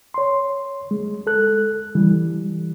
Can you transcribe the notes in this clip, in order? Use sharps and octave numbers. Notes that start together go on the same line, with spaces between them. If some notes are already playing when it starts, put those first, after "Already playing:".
C#5 C6
G#3
A4 F#6
E3 G3